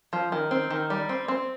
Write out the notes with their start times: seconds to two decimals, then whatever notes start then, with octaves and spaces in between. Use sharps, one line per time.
0.13 F3
0.32 D#3
0.51 C4
0.70 D#3
0.90 G3
1.09 C4
1.28 C4